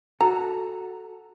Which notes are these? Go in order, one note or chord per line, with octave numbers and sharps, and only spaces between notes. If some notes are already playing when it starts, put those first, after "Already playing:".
F#4 A4 A#5